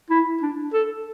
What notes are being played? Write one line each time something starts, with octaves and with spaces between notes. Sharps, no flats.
E4
D4
A4